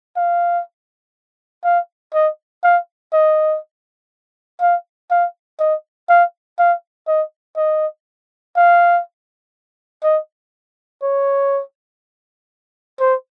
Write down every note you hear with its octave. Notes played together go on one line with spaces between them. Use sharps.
F5
F5
D#5
F5
D#5
F5
F5
D#5
F5
F5
D#5
D#5
F5
D#5
C#5
C5